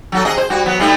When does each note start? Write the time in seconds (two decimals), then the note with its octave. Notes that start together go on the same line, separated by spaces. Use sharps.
0.12 F#3 F#4 A4
0.25 C3 G#4 D#5
0.37 C5
0.50 G3 F#4
0.66 F#3 B3
0.80 G3 A3 D#4